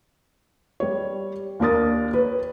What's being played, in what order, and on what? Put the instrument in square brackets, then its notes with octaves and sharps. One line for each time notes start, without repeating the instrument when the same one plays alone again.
[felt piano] G3 C#5
D#2 A#3 D4 A#4 D#6 A6
B4 C#5